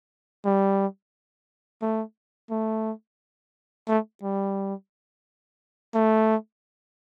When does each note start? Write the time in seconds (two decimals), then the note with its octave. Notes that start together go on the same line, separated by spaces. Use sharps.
0.45 G3
1.82 A3
2.51 A3
3.88 A3
4.23 G3
5.94 A3